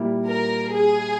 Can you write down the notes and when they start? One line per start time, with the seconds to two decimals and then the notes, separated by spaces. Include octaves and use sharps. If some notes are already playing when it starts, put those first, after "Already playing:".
Already playing: A#2 G3 A#3 E4
0.27 A#4
0.73 G#4